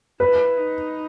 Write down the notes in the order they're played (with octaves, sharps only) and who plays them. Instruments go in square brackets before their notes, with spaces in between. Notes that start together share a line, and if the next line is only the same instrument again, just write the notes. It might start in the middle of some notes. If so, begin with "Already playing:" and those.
[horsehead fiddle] E4 [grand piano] B4
[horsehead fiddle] D#4